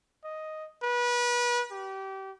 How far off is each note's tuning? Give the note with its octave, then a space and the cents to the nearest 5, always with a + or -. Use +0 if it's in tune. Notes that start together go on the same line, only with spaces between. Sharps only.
D#5 +5
B4 -30
G4 -25